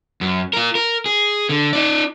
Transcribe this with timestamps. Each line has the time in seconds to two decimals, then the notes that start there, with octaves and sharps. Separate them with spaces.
0.21 F#2
0.53 F4 A#4
0.75 A#4
1.06 G#4
1.49 D3
1.73 D#4 D5